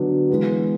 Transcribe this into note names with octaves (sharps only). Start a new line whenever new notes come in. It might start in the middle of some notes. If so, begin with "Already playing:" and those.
Already playing: D3 F#3 B3 D4
E3 G#3 B3